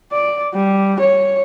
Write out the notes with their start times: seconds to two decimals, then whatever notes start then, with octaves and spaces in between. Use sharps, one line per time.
0.12 D5
0.54 G3
1.00 C#5